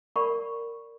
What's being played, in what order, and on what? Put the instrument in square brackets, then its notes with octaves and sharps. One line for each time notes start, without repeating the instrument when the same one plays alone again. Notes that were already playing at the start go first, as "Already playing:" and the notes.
[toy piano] A#4 D5 F#5 B5 C#6